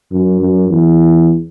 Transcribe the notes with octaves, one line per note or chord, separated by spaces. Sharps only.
F#2
F#2
E2